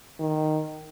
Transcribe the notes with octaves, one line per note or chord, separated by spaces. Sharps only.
D#3